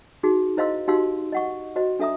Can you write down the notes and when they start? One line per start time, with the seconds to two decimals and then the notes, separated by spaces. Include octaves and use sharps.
0.23 D#4 F#4 G#4
0.57 E4 C5 D#5 F5 C6 E6
0.88 D#4 F#4 G4 F5 C6 E6
1.32 D#5 F#5 C#6
1.76 F#4 C5 D#5
1.99 D4 A4 E5 A#5 D#6